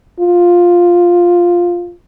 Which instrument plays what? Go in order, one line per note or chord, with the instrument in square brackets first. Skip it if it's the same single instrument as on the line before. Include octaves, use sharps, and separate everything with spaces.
[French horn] F4